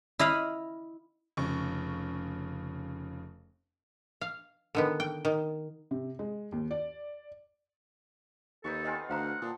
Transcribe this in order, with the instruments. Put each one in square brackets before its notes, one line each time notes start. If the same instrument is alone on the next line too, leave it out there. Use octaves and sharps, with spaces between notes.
[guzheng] E4 D#5 F5 B5
[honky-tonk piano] F1 C#3 C#6
[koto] F5
D3 D#3 B3
G5
D#3
[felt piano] C3
G#3
D#2
D5
[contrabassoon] D#2 [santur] D#4 B4 C#6 [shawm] A4
[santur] B3 C4 F4 [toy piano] D#5 G#5
[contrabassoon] D2 [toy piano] C5 F5 A#5 [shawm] F#5
[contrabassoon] A#2 [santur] A5 C6 D#6